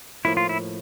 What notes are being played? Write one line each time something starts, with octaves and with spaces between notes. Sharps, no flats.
A2 F3 A#3 E4
F4
E4